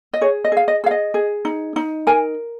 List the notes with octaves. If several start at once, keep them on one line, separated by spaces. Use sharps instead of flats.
D#5
G#4 C#5
D#5
G#4 F5
D#5
G#4 F5
D#5
G#4
D#4
D#4
A#4 G#5